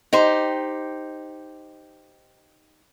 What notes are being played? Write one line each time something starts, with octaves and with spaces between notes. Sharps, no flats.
D#4 G4 C5